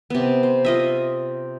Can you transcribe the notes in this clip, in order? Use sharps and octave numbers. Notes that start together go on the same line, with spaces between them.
C3 B3
C5
F4 D#5 E5